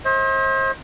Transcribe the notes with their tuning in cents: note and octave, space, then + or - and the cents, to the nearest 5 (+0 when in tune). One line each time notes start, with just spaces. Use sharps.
C5 +35 D#5 +45